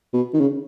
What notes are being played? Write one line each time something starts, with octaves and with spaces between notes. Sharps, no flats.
B2
D#3
C#3